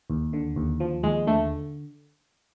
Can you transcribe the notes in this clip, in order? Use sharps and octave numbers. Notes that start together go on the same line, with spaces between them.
D#2
D3
D#2
F3
D#2 G#3
D3 A3